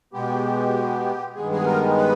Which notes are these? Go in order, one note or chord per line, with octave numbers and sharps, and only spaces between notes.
B2 G#3 B3 G4
G2 D#3 G#3 B3 G#4
G#4
A#4
B4